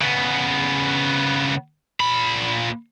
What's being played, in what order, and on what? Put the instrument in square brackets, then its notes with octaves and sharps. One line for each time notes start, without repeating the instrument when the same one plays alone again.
[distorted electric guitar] C#3 B3
A#2 B5